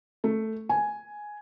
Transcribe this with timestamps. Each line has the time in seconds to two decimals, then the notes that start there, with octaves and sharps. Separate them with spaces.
0.24 A3
0.69 G#5